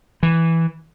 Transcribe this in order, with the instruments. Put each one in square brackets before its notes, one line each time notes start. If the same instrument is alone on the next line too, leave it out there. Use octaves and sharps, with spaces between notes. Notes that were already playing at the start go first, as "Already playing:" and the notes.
[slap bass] E3